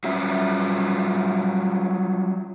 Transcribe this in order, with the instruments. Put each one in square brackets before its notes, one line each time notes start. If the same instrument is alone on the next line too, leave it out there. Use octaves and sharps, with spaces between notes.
[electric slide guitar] F#3 G3 C#4 F4 E5